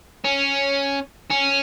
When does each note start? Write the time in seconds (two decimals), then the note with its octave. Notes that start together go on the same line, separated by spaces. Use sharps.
0.24 C#4
1.30 C#4